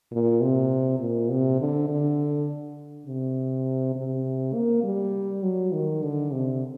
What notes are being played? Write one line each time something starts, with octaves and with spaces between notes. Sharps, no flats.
A#2
C3
A#2
C3
D3
D3
C3
C3
A#3
G3
F#3
D#3
D3
C3